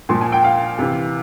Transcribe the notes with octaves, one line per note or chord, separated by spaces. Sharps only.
A#2 F3 C6
G#5
G5
F5
C3 E3